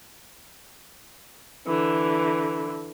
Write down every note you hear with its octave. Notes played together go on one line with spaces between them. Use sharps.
D3 E3